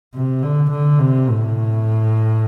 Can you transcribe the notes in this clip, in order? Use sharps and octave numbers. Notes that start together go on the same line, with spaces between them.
C3
D3
D3
C3
A2